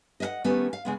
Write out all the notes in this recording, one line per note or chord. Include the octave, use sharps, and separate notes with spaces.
D#5 E5 F#5
D#3 G3 A3 B3 C#4
F5
C#3 G#3 B3